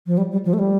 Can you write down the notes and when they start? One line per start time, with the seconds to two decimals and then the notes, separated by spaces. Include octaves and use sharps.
0.07 F3
0.18 G3
0.32 G3
0.46 F3
0.53 A3
0.59 G3